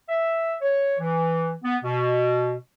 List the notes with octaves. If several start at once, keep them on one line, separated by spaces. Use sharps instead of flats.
E5
C#5
E3
B3
B2